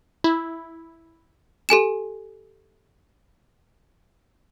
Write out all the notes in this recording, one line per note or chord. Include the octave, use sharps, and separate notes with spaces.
E4
G4 A4 G#5 E7